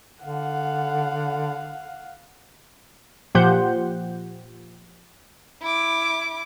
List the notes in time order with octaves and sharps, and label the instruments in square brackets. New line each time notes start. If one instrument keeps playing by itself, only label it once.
[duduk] D3 [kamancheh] F5 F#5
[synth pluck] A#2 F3 G4 C5 F#5 G6
[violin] E4 D6